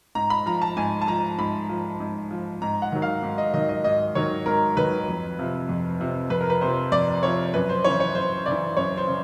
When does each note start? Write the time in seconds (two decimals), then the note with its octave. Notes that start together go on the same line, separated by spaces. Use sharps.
0.15 G#2 A#5
0.30 B5
0.46 F3 A#5
0.62 A5
0.76 G#2 G#5
1.01 A5
1.08 F3 A#5
1.38 G#2 B5
1.69 F3
2.00 G#2
2.31 F3
2.62 G#2 A#5
2.82 F#5
2.92 D#3 F#3
3.02 F5
3.23 G#2
3.38 D#5
3.54 D#3 F#3 D#5
3.69 D#5
3.84 G#2 D#5
4.15 D#3 F#3 C#5
4.46 G#2 A#4
4.77 D#3 F#3 B4
5.08 F2
5.39 C3 F3
5.69 F2
6.00 C3 F3
6.30 F2 B4
6.41 A#4
6.50 B4
6.61 C3 F3 C5
6.92 F2 D5
7.23 C3 F3 C#5
7.54 F#2 B4
7.69 C5
7.84 C#3 E3 C#5
8.00 C#5
8.15 F#2 C5
8.46 C#3 D5
8.51 E3
8.77 F#2 C#5
8.97 C5
9.08 C#3